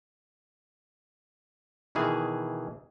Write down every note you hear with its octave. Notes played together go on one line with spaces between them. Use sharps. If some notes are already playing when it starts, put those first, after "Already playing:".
B2 D#3 E3 G#4